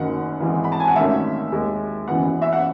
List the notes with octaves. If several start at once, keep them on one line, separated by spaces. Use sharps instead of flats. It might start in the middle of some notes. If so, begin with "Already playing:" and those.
Already playing: F#1 F#2 D#3 F#5
G#1 G#2 E3
B5
A5
G#5
F#5
G#1 F#2 D#3 A3 C#4 E5
D#2 D#3 G#3
F#1 F#2 E3 B3 F#5
E5
F#5